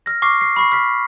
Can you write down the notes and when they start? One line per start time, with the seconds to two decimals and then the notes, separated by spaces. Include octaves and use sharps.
0.06 F6 A#6
0.22 C#6 D6 F6 C7
0.41 C7
0.56 B5 C#6 C7
0.72 F6 B6